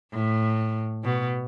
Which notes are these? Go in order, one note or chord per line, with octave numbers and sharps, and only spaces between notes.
A2
B2